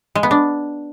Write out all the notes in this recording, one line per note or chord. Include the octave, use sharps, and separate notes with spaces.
G#3
B3
D4